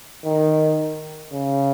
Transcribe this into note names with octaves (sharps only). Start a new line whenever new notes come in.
D#3
C#3